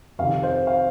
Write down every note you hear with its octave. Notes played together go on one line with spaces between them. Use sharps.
F2 C3 D#3 F5
C5
F5